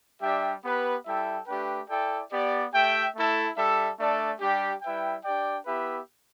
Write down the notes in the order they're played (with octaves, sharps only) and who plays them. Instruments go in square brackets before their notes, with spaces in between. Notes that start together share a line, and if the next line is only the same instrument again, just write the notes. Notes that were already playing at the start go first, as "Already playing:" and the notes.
[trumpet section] G3 D4 G4 E5 G5
B3 G4 B4
G3 E4 A4 E5 G5
A3 D4 G4 B4 G5
E4 A4 D5 G5
B3 G4 D5
A3 G4 E5 G5
A3 E4 A4
G3 D4 A4 E5
A3 D4 A4 D5
G3 D4 G4
G3 E4 B4 E5 G5
D4 G4 D5 G5
B3 E4 G4 B4 E5